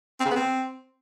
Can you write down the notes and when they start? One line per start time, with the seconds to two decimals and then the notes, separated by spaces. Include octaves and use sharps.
0.20 C4
0.26 C#3
0.31 B3
0.36 C4